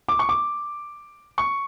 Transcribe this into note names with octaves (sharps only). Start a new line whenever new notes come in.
D6
C#6
D6
C#6